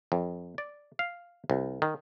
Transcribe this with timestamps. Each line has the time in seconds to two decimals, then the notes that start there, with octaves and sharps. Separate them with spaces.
0.12 F2
0.58 D5
0.99 F5
1.50 C2
1.82 D#3